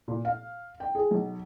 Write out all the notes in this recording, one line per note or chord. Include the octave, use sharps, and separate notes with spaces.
A#2
F5
G5
G#4
B1